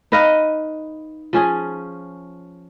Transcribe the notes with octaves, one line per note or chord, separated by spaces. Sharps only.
D#4 B4 D#5 F5
F3 C#4 G#4